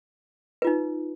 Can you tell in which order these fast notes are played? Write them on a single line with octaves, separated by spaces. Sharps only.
B4 F4 D#4